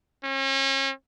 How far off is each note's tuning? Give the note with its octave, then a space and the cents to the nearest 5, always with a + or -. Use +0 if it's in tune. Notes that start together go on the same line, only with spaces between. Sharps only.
C#4 -40